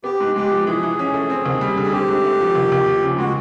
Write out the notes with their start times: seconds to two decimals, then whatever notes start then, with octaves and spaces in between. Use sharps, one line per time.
0.04 B3 G4
0.20 G#2
0.36 G#3 G4
0.51 F3
0.67 E3 G#4
0.83 E3
0.99 C#4
1.14 A3
1.30 C4
1.46 D#2
1.61 G3
1.77 D3
1.82 G#4
1.92 C4 G4
2.08 G#2
2.24 A3
2.40 F3
2.55 D#2
2.72 D#2
2.87 F3
3.03 C#3
3.18 G#3 F#4